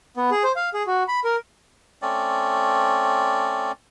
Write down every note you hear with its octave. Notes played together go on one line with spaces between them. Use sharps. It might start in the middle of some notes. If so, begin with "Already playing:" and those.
B3
G#4
C5
F5
G#4
F#4
B5
A#4
A3 C4 C#4 D5